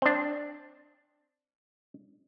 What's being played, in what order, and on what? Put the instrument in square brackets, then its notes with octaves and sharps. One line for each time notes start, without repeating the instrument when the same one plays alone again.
[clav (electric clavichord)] C4 D4